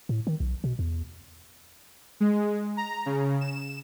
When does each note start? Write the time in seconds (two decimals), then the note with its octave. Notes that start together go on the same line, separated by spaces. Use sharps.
0.09 A2
0.27 D#3
0.40 B1
0.64 B2
0.79 E2
2.20 G#3
2.77 A#5
3.06 C#3
3.41 E7